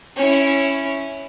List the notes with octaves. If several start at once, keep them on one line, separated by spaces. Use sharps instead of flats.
C#4 E4